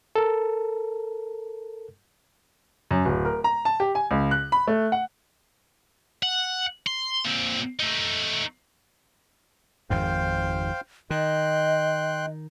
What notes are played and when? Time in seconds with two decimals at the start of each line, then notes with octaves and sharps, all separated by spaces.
0.16 A4 A#4
2.91 F#2
3.05 D1
3.25 A#4
3.44 A#5
3.65 A5
3.80 G4
3.95 G#5
4.11 C#2
4.31 F#6
4.52 B5
4.67 A3
4.92 F#5
6.23 F#5
6.87 C6
7.25 A#2 C4
7.80 A3 D#4
9.90 G#1 F2 G#2 C5 F5 G5
11.10 D#3 D#5 G5 C6 F#6